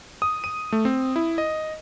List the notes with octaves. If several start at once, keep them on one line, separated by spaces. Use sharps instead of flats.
D#6
D#7
A3
C4
E4
D#5